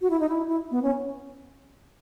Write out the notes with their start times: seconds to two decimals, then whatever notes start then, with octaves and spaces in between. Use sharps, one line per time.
0.01 F#4
0.10 E4
0.20 D#4
0.29 E4
0.47 E4
0.71 B3
0.83 C#4